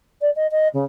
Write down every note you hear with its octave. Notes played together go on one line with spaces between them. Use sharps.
D5
D#5
D#5
C#3